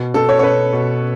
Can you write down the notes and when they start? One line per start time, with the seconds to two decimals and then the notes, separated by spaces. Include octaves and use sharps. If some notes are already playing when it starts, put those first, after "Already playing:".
Already playing: B2
0.14 B2 A4
0.29 C#5
0.39 C#5
0.43 B2 B4
0.73 B2